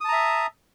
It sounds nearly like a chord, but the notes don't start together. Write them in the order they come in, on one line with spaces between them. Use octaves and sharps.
D#6 A5 A#5 E5